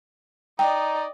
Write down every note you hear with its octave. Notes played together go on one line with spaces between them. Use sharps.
D#4 D5 D#5 G5